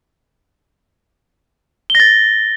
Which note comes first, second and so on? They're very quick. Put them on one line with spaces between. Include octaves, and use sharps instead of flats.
G7 A#6 A6